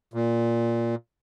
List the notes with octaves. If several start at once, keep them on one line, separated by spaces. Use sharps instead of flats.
A#2